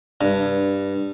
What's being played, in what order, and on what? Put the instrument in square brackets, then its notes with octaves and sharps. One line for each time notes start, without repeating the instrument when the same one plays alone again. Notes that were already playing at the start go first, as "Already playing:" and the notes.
[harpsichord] G2